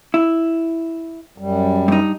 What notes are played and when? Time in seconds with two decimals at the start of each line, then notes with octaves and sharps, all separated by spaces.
0.14 E4
1.38 F#2 G3
1.88 G2 D#4